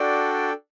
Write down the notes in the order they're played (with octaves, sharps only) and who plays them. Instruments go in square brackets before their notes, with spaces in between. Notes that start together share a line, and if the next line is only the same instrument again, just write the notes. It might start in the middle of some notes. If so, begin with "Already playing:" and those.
Already playing: [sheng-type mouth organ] D4 F#4 A4 D5 G5